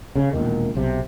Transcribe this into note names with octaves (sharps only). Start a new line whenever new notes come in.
C#3
E1 B1 A#2 D#3
B1 C3